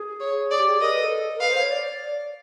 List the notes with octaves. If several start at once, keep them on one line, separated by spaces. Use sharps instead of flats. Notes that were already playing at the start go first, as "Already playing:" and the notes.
Already playing: G#4
C#5
G#4 D5
G4
G#4
A#4 D#5
B4
A4
A#4
B4 F5
C5
C#5
D5